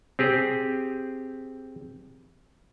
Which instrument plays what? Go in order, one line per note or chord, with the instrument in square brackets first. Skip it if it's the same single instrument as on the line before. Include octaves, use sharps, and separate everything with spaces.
[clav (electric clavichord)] C4 G4 G#4